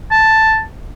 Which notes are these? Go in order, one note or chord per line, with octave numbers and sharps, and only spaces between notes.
A5